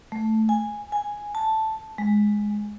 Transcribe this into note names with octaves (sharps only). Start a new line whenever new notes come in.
A3
G#5
G#5
A5
G#3